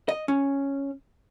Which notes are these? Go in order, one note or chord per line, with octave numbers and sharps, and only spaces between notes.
D#5
C#4